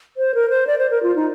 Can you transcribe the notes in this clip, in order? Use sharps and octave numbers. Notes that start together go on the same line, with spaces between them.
C5
A#4
C5
D5
C5
A#4
F4
D#4